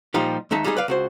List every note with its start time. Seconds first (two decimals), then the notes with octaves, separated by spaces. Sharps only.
0.14 A#2 F3 G3 D#4 G4
0.51 D#2 G#3 D#4 E5 A5
0.64 G3 G#3 D#4 G4 G#4
0.77 B4 D5 F5
0.88 C#2 F#4 C5